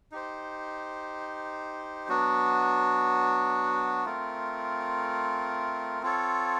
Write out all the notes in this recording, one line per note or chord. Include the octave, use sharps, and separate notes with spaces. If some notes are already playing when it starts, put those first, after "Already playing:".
D#4 G4 C5
F#3 B3 D4 F#4
A3 C4 F4 A#4
C4 F4 A4 C#5